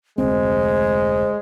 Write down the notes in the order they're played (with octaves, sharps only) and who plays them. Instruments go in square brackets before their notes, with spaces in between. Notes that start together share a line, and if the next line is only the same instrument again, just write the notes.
[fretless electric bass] F1 D2 C4 [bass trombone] G#3 [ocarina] C5